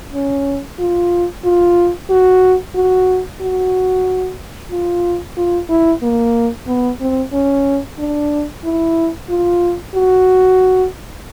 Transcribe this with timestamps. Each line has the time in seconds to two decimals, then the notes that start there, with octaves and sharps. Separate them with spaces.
0.14 C#4
0.80 F4
1.45 F4
2.10 F#4
2.75 F#4
3.41 F#4
4.72 F4
5.37 F4
5.70 E4
6.03 A#3
6.68 B3
7.00 C4
7.33 C#4
7.99 D4
8.64 E4
9.30 F4
9.95 F#4